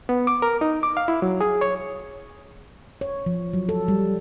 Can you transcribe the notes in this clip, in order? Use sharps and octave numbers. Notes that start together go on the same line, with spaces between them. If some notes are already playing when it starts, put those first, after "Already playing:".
B3
D6
A#4
D#4
D6
F5
E4
F#3
G#4
C#5
C#5
F3
F#3
A4
G3